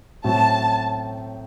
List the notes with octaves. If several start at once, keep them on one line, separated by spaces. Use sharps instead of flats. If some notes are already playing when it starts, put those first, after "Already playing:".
A2 F#3 C4 F#4 A5